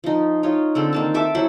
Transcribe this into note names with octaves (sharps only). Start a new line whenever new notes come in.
F3 D#4
D#4 F4 C#5
D3 C4 A4
D#3 A#3 A5
A4 E5 D6
F#3 E4 C5